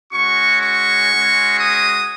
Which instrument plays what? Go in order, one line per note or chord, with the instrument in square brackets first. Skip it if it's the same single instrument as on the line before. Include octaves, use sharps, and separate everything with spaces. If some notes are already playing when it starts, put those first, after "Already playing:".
[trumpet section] G#3 C#4 F#4 C#6
C#6
G#3 C#4 F#4
D#6